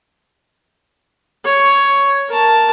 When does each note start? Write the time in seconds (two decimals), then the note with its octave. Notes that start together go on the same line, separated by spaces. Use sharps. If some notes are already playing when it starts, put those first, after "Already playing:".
1.45 C#5
2.29 A#4 A5